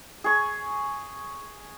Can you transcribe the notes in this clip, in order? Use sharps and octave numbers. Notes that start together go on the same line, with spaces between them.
G#4 C#6